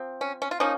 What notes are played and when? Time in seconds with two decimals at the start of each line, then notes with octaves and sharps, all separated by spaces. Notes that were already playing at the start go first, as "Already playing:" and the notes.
Already playing: F3 C4
0.21 C#4
0.42 C#4
0.51 F4
0.60 F3 A#3 C#4 D#4